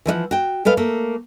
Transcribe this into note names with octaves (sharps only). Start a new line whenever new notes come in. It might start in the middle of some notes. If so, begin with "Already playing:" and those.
E3 F3 D#5 F#5
F#4 G5
G#3 A4 B4 F5
A3 A#3